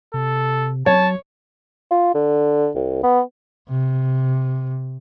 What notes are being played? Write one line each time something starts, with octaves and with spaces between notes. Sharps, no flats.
C3 A4
F#3 C#5 A5
F4
D3
C2
B3
C3